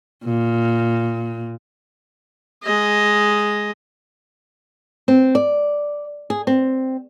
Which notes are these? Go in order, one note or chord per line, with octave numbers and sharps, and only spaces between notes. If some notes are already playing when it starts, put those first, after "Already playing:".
A#2
G#3 D#5
C4
D5
G#4
C4